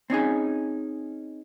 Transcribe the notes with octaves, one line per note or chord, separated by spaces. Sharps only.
C4 C#4 D#4 G#4